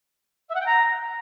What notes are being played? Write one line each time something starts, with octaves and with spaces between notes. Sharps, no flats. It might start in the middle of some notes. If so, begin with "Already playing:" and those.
E5
F#5
G5
A#5